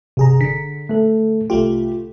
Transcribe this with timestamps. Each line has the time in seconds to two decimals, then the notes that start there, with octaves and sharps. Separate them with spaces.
0.17 G1 C3 G#4 A#5
0.41 D3 B6
0.89 A3 A4
1.50 C2 A3 F4 G4